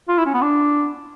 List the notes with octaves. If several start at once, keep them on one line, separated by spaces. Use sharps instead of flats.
F4
E4
C#4
B3
D4